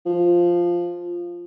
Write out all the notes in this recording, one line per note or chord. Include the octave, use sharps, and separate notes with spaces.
F3